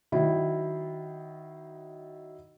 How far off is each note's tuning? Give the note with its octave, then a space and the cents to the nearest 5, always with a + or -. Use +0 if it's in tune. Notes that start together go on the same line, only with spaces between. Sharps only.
D#3 +0 F#3 +15 E4 -5